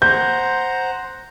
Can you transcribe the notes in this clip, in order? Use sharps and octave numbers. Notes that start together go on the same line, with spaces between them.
C5 F#5 A#5 G6